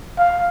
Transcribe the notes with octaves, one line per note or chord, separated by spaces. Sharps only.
F5